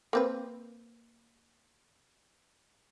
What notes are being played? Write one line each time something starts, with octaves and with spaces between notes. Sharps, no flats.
A#3 C4 B4